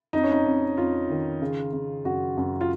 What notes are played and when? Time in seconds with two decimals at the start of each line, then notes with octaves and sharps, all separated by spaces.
0.13 F2 D#4
0.23 C#4
0.32 D#4
0.45 F2
0.77 F2 F4
1.09 D#3
1.42 C#3
1.73 C#3
2.05 F#2 F#4
2.37 F#2
2.61 F4